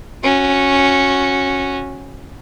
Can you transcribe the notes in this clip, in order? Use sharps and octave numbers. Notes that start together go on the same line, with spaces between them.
C#4 F#4